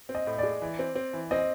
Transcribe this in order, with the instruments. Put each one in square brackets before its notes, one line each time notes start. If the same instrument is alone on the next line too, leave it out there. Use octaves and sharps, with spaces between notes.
[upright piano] C4
[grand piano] D#5
[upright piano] A2
[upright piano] G#3 [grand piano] D5
[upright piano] E3
C4
C4
E3
[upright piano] C4 [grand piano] D#5